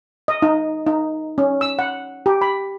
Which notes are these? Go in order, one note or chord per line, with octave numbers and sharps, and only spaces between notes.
D#5
D#4
D#4
C#4
E6
F#5
G4
B5